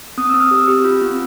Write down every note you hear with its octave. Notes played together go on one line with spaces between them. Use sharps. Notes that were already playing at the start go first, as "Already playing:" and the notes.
C4 D#6
C4 E6
F6
G4 E6
G4
F4
C4